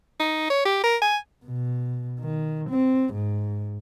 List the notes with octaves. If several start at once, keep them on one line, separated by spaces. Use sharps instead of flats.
D#4
C#5
G4
A#4
G#5
B2
D#3
C4
G#2